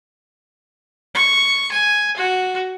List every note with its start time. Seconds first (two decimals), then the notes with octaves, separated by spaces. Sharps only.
1.15 C#6
1.72 G#5
2.17 F#4